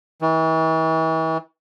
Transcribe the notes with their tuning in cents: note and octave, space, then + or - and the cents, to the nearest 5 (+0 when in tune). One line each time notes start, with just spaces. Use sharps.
E3 -40